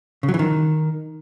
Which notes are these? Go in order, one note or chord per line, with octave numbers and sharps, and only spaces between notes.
C#3
F#3
E3
D#3